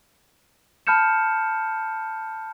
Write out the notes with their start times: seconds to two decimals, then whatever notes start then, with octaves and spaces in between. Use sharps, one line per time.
0.87 A5 B5 F6 G6 C#7 E7